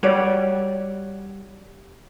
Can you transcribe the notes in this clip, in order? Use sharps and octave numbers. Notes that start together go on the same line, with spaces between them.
G3 F#4 C#5 D5